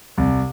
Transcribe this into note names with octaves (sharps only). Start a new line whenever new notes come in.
C2